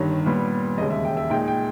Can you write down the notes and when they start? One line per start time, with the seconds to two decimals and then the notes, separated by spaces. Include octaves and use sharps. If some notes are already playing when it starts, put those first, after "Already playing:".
Already playing: G1 G2 D#3 C#5
0.26 A#2 G3 B3
0.78 E1 D#2 C#3 G#3 D#5
0.90 E5
1.05 G5
1.17 E5
1.30 A#2 G#3 D#4 G5
1.48 G5